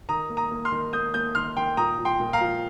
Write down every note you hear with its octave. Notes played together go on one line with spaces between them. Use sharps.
D#3 A#5 D#6
A#3
A#5 D#6
A#3
C6 F6
D#3
A#3 D#6 G6
A#3 D#6 G6
D#3 C6 F6
D#3 G5 C6
A#2 A#5 D#6
F3
G5 C6
A#2
F5 A#5
F3